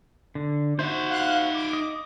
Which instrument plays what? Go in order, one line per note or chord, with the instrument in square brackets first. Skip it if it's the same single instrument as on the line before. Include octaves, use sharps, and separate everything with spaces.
[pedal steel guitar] D3
[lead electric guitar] D#4 E5 [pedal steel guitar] F#4 C5
[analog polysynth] F5 F#6
D6
[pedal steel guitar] D#5